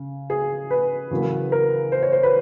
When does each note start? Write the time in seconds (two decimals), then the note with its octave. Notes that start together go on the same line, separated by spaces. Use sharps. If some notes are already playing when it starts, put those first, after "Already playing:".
Already playing: C#3
0.30 G#4
0.71 B4
1.11 E2 C#3 F#3 A#3
1.52 A#4
1.92 C5
2.03 C#5
2.12 C5
2.23 B4